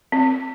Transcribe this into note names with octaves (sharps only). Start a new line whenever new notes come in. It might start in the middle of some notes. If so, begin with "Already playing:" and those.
C4